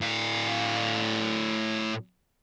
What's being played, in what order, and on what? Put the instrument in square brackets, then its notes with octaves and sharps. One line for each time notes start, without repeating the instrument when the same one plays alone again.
[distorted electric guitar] A2 F5